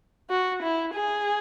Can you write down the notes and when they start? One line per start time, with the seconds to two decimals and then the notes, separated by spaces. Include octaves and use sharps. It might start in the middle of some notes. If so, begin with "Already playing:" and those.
0.30 F#4
0.63 E4
0.94 G#4